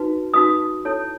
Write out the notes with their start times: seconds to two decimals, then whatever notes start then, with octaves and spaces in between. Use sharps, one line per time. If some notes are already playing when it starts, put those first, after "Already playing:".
Already playing: D#4 F#4 B4
0.34 D#4 F#4 B4 D#6
0.85 E4 A4 C#5